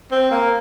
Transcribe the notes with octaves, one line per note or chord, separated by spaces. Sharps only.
C4
A#3